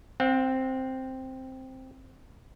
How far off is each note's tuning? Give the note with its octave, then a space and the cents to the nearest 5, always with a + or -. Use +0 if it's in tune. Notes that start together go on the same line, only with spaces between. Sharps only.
C4 +0 F#5 -40